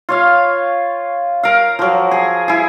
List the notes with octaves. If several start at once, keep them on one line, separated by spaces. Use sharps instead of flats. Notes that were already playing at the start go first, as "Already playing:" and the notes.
F4 C#5 F5
A#4 F5
F3 F#3
G#4
E4 G#4